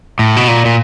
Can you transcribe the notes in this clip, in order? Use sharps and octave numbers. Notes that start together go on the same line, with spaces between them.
A2
B2
A#2
A#2